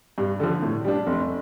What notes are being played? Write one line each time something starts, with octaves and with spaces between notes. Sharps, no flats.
G2
D3 F3
A2
G3 D4
F1